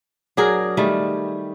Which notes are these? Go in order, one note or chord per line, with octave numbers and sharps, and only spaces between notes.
F#3 D4 G#4 A#4
D#3 G3 A3